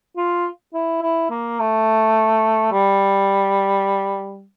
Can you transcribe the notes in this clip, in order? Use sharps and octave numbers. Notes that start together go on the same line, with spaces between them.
F4
E4
E4
A#3
A3
G3